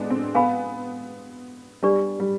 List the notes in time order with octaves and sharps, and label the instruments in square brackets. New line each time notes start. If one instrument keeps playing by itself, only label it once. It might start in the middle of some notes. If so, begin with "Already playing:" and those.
Already playing: [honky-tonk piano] G#3 B3 D4
C4
[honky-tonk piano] B3 [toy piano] B4 F5 G#5 B5
[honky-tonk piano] G3 [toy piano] D4 G4 B4 D5
[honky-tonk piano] G3